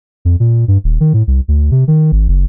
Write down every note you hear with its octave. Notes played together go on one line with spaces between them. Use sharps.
F2
A#2
G2
D#1
D#3
A2
C2
D2
C3
D#3
G#1
F#1